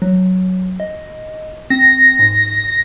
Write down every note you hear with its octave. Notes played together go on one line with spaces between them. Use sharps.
F#3
D#5
C4 A#6
G#2